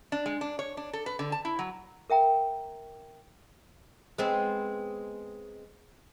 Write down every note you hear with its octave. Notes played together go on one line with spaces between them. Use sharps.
D4
G#3
D4
C#5
D4
A4
B4
D3
A5
E4
F#3
A#4 E5 G5 A#5
G#3 B3 C4